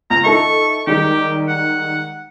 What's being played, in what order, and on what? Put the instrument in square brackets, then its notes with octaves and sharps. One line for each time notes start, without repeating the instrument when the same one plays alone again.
[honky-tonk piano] C#2 [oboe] A#5
[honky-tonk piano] D#4 A4 E5 [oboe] C#6
[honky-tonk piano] D#3 G3 G#3 [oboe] G4
[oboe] F#5